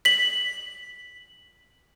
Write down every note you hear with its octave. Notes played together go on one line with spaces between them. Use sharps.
B6 F#7